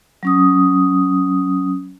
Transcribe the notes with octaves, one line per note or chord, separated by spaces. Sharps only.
F#3 C#4 D#6